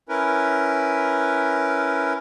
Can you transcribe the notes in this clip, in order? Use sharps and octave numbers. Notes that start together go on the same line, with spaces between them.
C#4 E4 A#4 B4